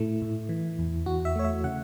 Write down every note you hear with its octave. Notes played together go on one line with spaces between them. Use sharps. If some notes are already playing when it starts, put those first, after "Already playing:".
Already playing: A2 A3 E4
A2
E3
E2
E2 F#4
E5
A3 C#5
E5
C#3 F#5